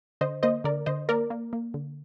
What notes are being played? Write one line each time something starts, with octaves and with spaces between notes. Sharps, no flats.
D3 C5 D#5
A#3 C5 D#5
D3 A#4 D5
D3 C5 D#5
A#3 A#4 D5
A#3
A#3
D3